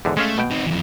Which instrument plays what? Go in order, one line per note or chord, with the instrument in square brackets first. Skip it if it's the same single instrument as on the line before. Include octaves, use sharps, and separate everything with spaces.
[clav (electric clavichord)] E2 G#2 D3
[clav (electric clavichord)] G#3 C#4 F5 [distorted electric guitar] A3
[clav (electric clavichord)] B2 G5
[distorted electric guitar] C4 D#4
F2 E3